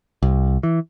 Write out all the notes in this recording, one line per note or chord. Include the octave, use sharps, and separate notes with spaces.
C2
E3